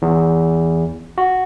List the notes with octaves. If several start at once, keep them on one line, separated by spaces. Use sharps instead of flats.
E2
F#4